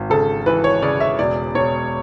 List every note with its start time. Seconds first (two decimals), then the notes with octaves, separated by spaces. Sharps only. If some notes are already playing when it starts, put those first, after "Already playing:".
Already playing: G#1
0.10 C#3 A4
0.46 E3 B4
0.64 C#5
0.82 C#3 D5
1.00 E5
1.19 E1 D5
1.55 E1 C#5